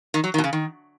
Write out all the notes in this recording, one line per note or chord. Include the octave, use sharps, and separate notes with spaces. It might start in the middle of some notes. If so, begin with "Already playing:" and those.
D#3
F#3
D#3
B2
C#3
D#3